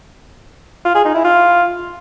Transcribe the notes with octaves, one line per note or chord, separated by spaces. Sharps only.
F4
G#4
D#4
E4
F4